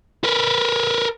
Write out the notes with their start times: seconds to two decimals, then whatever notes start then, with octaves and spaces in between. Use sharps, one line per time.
0.24 A#4 B4